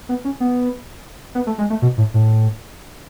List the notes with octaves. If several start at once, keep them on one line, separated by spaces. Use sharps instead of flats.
B3
C#4
B3
B3
A3
G#3
A3
B2
A2
A2